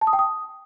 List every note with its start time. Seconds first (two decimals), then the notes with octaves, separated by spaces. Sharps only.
0.01 A5
0.07 D#6
0.13 G5
0.19 D#6